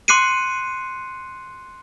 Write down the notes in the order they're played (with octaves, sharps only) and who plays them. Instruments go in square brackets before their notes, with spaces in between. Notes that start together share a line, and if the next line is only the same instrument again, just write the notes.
[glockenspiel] C6 D6 F#6 C7 C#7 D#7